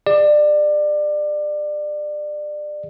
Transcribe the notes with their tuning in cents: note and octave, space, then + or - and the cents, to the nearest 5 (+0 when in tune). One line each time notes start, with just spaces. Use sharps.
G#4 -30 D5 +25